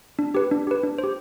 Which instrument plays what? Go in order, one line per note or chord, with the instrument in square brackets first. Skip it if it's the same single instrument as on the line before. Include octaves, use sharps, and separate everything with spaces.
[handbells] D4
G4 B4
D4
G4 B4
D4
C5
G4